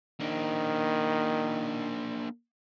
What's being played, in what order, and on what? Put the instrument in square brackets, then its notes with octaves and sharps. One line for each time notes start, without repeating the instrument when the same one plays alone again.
[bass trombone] D#3 [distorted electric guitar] A#3 D4